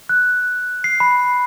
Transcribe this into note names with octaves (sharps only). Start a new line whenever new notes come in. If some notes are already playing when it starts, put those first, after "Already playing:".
F#6
C7
B5